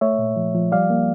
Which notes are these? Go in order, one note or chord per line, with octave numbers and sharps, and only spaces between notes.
A3 C#5 E5
A#2
F3
F3
G3 D5 F5
A#3